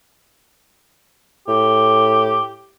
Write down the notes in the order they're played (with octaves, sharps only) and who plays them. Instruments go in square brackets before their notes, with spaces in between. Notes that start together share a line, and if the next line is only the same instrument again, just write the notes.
[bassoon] A2 [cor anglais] G4